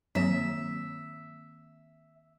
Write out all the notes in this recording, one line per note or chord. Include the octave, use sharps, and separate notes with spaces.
G2 D#3 F#3 A#3 C4 E5 E7